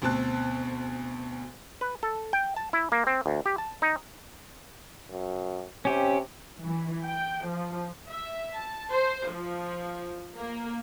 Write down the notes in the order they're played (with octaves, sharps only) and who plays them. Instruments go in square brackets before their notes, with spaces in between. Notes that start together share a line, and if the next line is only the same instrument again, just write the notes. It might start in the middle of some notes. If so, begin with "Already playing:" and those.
[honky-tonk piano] D2 B2 C4 A5 F#6
[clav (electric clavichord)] B4
A4
G5
A5
E4
A#3
C4
D2
G4
A5
D#4
[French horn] F#2
[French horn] C3 [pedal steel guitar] C#4 G4
[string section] E3
G5
F3
[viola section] E5
A5
C5
F3
A#3